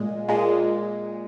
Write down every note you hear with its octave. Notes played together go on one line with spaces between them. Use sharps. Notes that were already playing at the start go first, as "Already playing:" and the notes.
Already playing: A#2 G#3
A#2 G#3